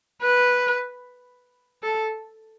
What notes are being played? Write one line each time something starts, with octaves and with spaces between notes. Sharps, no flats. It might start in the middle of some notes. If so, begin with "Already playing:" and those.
B4
A4